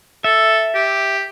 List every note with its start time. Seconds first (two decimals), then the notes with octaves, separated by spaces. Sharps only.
0.24 A4 E5
0.75 G4